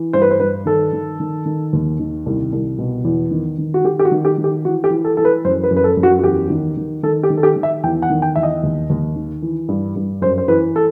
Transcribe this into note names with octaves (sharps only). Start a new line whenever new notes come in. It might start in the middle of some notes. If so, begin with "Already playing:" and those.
Already playing: E3
G2 C5
B4
C5
G2 B4
D#3 A4
D#3
D#3
D#3
D#2
D#3
C2
C2
B2
E2
D#3
D#3
F#4
D#3 G4
G4
F#4
D#3
G4
D#3
G4
E3 F#4
G4
E3
A4
E3 A4
B4
F#2 C5
B4
F#2
B4
A4
F#2
F#4
F#4
E2 G4
D#3
D#3
D#3 A4
G4
D#3
A4
G4
D#3
E5
E2 G5
F#5
D#3
G5
E2 E5
D#5
D#2
D#2
D#3
E3
G2
G2
F#2 C5
C5
E3 B4
A4